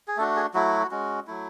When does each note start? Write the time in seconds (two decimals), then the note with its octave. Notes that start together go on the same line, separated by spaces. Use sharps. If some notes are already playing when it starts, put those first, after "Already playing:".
0.08 G#4
0.17 A3 D4 F#4 A4
0.36 G#4
0.54 F#3 A3 E4 F#4
0.91 G#3 C#4 F#4
1.27 F#3 A3 E4